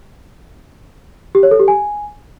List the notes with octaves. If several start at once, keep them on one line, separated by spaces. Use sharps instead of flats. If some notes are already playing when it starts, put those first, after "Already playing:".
G4
C#5
A4
G4
G#5